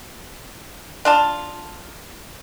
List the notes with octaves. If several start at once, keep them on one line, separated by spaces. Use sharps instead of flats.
D4 F4 A5